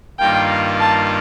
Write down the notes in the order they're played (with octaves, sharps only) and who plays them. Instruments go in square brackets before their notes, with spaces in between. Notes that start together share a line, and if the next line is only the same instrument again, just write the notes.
[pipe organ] G2 D#3 A#3 F4 [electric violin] G5
[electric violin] A5